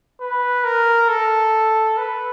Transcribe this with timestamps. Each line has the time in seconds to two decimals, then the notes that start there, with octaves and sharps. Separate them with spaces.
0.21 B4
0.64 A#4
1.09 A4
1.97 B4